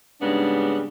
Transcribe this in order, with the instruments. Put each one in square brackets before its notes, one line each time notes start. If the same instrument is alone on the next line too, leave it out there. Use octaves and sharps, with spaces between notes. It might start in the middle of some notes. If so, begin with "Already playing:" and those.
[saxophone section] G#2 C#3 G3 B3 D4